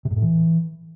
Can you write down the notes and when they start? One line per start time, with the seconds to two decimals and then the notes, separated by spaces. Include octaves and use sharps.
0.05 C3
0.11 G#2
0.16 A2
0.22 E3